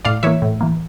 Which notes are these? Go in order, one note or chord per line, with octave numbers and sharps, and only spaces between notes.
A2 D5 F5
E3 A#3 C#5 E5
A2
E3 A#3